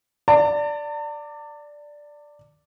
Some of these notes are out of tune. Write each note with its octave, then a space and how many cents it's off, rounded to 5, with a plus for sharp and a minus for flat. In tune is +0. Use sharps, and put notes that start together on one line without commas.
D5 +0 A5 +45